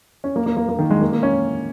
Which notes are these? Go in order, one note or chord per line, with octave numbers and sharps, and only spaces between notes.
C#4
A#3
A#3
A#3
A#3
D#3
G#3
A#3
A#3
C#4